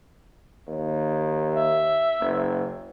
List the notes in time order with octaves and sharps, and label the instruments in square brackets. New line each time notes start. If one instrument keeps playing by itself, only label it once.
[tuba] D#2
[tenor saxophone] E5
[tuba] F#1